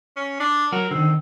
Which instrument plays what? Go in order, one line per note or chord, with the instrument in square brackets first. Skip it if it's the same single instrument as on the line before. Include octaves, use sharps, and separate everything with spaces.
[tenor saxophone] C#4
D4
[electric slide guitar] F#3 F#4 [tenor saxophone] A#4
[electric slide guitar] D3 D#3 [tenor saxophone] C4